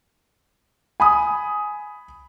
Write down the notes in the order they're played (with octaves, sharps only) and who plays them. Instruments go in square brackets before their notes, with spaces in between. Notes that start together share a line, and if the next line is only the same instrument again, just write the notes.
[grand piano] G#5 B5 D#6